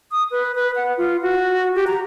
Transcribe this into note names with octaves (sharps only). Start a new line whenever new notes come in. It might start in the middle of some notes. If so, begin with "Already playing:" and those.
D#6
B4
B4
F#5
F4
F#4
G4
A#5